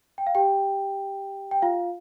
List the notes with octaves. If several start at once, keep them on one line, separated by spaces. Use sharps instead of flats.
G5
F5
G4 G5
G5
F4 F5